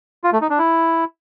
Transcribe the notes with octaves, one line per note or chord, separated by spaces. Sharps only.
F4
A3
D#4
D4
E4